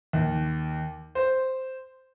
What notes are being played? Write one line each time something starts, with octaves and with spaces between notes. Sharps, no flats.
D#2
C5